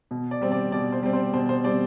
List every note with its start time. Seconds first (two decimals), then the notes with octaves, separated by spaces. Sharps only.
0.11 B2
0.31 D5
0.41 G3 C4
0.52 D5
0.72 B2 D5
0.92 C5
1.03 G3 C4
1.13 C5
1.33 B2 C5
1.49 C5
1.64 G3 C4 D5